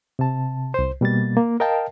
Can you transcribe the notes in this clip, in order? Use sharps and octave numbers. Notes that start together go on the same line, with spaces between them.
C3 A5
C2 C5
B2 G3 A#3 A6
A#3
A#4 D#5 F5 G5 A5